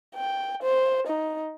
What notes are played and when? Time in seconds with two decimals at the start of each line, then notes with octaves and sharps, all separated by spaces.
0.16 G5
0.62 C5
1.07 D#4